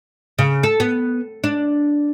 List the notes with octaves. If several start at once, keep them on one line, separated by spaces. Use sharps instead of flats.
C#3
A4
B3
D4